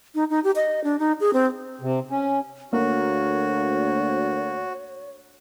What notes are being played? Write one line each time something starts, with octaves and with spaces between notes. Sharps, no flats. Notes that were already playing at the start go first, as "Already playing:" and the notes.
D#4
D#4
G4
D#5
D4
D#4
G#4
C4
C3
C#4
D2 A#3 F#4 C#5